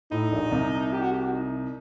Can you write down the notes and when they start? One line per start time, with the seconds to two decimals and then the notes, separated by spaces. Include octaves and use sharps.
0.11 A2 D#4
0.31 A#1 A#2
0.52 C2 C3
0.93 G4
1.02 F#4
1.12 G4
1.22 F#4
1.33 D#4